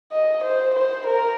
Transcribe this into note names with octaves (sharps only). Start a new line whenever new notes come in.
D#5
C5
C5
A#4